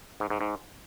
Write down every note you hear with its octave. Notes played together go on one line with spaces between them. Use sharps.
G#2
G#2
G#2